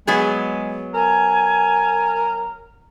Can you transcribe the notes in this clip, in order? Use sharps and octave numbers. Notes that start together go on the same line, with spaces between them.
F#3 G#3 B3 G#4
A#4 G#5